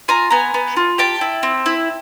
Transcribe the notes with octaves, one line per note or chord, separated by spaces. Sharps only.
F4 G#5 A#5
B3 G#5 A#5
B3
F4
G4 G5 A5
E4
C4
E4